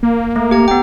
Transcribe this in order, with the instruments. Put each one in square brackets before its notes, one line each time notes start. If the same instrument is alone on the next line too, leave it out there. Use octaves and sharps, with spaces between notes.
[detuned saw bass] A#3
[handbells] A3
G4 A#5
B3 G5